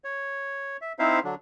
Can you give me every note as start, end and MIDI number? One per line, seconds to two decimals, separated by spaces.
0.04 0.77 73
0.81 0.93 76
0.99 1.20 60
0.99 1.20 63
0.99 1.20 64
0.99 1.20 72
0.99 1.20 76
0.99 1.20 77
1.24 1.35 50
1.24 1.35 54
1.24 1.35 62